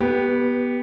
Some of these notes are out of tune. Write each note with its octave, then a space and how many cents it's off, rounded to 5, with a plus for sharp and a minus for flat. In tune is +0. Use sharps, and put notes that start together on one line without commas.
B3 -15 G4 +0 B4 +10